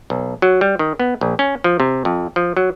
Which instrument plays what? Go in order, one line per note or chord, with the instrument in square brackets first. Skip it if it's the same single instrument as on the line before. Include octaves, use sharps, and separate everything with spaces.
[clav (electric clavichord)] B1
F#3
G3
D#3
B3
A#1
C#4
F3
C3
F2
F3
F#3